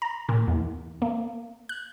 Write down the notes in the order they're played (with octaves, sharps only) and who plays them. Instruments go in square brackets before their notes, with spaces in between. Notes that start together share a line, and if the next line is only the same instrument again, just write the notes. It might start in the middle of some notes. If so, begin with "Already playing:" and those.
[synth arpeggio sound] A#5
A#2
E2
A#3
F#6